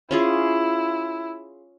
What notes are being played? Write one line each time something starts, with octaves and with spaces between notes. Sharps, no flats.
C#4 E4 F4 G#4